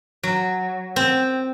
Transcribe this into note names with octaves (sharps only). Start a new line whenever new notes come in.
F#3
C4